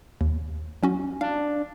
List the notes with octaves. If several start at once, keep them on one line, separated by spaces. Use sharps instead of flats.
D#2
F#3 C#4 F#4
D4 F5